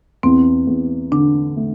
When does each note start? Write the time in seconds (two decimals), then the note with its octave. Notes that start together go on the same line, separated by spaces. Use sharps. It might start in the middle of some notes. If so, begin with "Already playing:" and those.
0.23 E2 C4
0.67 E2
1.11 D3 D4
1.56 A3